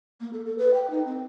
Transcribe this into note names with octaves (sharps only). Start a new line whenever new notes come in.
A#3
A4
A4
B4
G5
D#4
C4